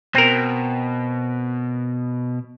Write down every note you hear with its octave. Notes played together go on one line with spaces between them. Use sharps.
B2 C4 A#4